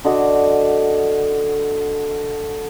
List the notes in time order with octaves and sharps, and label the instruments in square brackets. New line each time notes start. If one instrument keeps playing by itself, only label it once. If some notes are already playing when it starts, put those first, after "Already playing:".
[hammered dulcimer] D3 F#4 D#5 D6